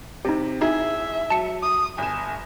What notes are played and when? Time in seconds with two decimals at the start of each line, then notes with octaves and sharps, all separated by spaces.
0.25 C3 C4 D#4 G4
0.61 D#4 E4 G#4 E5
1.30 F#3 A5 C#7
1.63 D#6
1.98 G1 G#5 E7